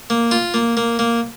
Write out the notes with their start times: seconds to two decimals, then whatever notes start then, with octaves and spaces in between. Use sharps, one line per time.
0.10 A#3
0.31 F4
0.54 A#3
0.77 A#3
0.99 A#3